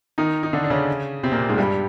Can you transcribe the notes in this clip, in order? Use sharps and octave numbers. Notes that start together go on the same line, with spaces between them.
D#3 D#4
D#4
D3 D4
D4
C#3 C#4
C3 C4
A#2 A#3
G#2 G#3
G2 G3